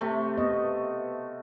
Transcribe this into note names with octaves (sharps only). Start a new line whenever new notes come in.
C3 A3
B3 D#5